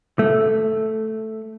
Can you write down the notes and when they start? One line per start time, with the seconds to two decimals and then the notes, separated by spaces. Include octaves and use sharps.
0.19 A3